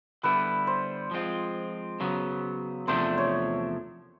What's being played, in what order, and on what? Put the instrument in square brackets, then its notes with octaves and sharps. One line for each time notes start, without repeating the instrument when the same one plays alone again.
[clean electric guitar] D3 G3 B3 E4 [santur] B4
[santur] C5
[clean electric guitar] F3 G#3 C4 F4
C#3 F#3 B3
[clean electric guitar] E2 C3 F3 A3 D4 [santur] C5
[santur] C#5